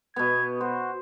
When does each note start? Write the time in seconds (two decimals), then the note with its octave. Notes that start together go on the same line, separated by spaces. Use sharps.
0.16 B2 B3 G#6
0.61 F#4 C5